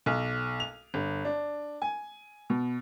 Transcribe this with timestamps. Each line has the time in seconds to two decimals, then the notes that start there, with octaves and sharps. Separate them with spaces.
0.06 B1
0.60 F7
0.94 G1
1.25 D4
1.82 G#5
2.50 B2